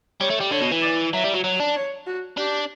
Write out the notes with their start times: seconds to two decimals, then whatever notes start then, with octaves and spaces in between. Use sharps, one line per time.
0.20 G3 C#5
0.30 A3
0.40 G3
0.51 D3 C#5
0.61 B2
0.72 E3
0.82 D5
1.13 F#3 E5
1.24 G3
1.34 F#3
1.44 F#3
1.60 D4
1.76 C#5
2.06 F#4
2.37 D4 G4